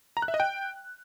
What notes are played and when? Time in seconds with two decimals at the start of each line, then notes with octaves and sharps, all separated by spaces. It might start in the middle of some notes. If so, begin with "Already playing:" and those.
0.17 A#5
0.22 F#6
0.28 E5
0.34 D#5
0.40 G5